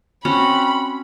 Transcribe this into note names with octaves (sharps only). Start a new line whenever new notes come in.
C4 C#4 F#4 B5